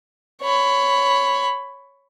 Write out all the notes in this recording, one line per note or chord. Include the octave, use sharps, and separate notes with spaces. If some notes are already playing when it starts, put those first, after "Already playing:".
C#5 B5